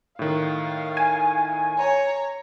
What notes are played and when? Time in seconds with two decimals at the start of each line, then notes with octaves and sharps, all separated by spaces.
0.19 A2 D#3 F5
0.97 G#5
1.78 C#5 A#5